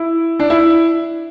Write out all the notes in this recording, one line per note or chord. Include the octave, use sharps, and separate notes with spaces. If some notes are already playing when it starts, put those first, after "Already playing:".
Already playing: E4
D4
E4